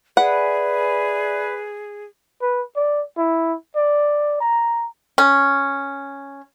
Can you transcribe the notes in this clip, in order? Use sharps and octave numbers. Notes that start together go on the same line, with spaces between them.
G#4 B4 D5 E5 F#5 G#5
B4
D5
E4
D5
A#5
C#4